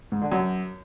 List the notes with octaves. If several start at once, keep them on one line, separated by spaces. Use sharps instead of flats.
G#2
D3
F#2